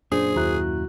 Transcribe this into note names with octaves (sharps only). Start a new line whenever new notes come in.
F#2 A#2 D4 G#4 C5
D#2 E4 F#4 A#5 F#6